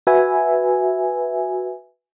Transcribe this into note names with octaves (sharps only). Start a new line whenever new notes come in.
F#4 B4 E5 G#5